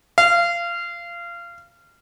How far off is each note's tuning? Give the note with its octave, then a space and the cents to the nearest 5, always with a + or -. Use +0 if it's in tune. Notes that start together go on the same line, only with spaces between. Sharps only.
F5 -25